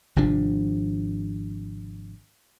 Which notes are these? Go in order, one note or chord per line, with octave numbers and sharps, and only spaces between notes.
G#1 C3 F3 D4